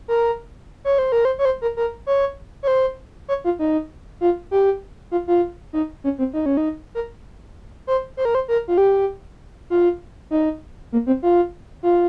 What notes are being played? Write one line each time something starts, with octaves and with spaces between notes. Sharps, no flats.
A#4
C#5
C5
A#4
C5
C#5
C5
A#4
A#4
C#5
C#5
C5
C#5
F4
D#4
F4
G4
F4
F4
D#4
C#4
C4
D#4
C#4
D#4
A#4
C5
C5
A#4
C5
A#4
F4
G4
F4
D#4
A#3
C4
F4
F4